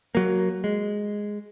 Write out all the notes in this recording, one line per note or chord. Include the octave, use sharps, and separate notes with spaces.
F#3 A#3
G#3